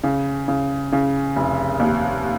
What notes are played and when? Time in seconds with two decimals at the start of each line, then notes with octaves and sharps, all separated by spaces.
0.03 C#3
0.48 C#3
0.92 C#3
1.36 F1
1.80 D#2